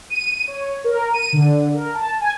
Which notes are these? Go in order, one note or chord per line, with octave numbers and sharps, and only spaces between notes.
D#7
C#5
A#4
D#7
D3
A#4
A5
G#5